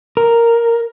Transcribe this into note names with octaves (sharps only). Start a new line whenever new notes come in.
A#4